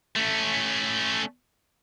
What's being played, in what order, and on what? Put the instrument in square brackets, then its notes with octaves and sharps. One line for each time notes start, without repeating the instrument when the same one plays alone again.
[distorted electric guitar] A3 C#4